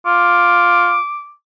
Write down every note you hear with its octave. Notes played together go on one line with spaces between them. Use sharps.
F4 D6